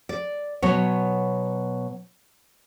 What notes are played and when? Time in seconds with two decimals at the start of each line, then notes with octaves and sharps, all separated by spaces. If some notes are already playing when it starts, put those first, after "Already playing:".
0.09 D5
0.62 B2 F#3 B3 C#5